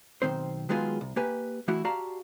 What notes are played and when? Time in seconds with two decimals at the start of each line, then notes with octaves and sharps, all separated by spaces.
0.22 B1 A2 D#3 C4 C5
0.69 D#3 F#3 G#3 B3 F4 G#4
1.01 C2
1.16 A#3 G4 B4 G#5
1.68 E3 A3 E4 F#4
1.85 F#4 G4 D5 F5 A5 A#5